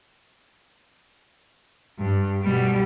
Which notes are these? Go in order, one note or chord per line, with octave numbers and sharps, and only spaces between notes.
G2
B2 G3